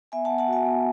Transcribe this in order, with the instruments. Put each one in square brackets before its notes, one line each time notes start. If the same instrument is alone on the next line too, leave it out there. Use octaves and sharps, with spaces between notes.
[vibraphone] B3 E5 G#5
B3 F#5 A5
F#5 A5
F#4 E5 G#5
B3